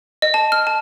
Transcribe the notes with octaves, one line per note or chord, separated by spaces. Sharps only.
D#5
A5
F6
A5